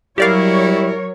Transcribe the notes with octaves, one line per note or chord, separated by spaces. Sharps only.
F#3 G3 E4 G4 A#4 C#5 D5 F5